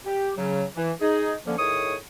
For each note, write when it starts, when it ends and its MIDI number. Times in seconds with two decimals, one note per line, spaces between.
0.06 0.31 67
0.36 0.64 49
0.36 0.64 54
0.76 0.91 52
1.01 1.33 63
1.01 1.33 68
1.46 1.54 50
1.46 1.54 53
1.46 1.54 58
1.46 1.54 61
1.58 1.95 45
1.58 1.95 51
1.58 1.95 68
1.58 1.95 73
1.58 1.95 85
1.58 1.95 87